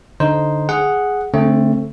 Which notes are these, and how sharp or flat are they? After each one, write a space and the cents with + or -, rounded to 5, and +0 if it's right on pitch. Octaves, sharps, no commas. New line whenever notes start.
D3 +0 D#4 +0 C5 +0
G#4 +0 F#5 +0
D3 -25 A3 +10 C4 +20